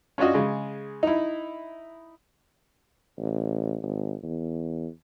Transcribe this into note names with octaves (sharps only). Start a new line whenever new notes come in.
C#4 D4 F4 F#4 D#5
C#3 G#3
D#4 E4
A1
G#1
E2